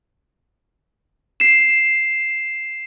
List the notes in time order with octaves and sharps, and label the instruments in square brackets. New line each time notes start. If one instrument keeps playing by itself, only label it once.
[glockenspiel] C7 E7